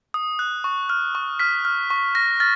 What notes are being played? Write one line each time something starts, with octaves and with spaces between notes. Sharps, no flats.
D#6
F#6
C#6
F6
C#6
F6 B6
F6
C#6
F6 A#6
F6 A6